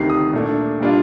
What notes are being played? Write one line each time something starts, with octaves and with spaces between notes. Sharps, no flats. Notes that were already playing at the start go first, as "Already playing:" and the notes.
Already playing: D2 C3 D#3 C7
D#6
A#2 A3 D4
A#2 G3 D4 F4